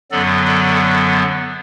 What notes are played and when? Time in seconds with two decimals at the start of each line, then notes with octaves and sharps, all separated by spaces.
0.12 F#2 D3 F#3 B3 A4 D5
0.46 A4 D5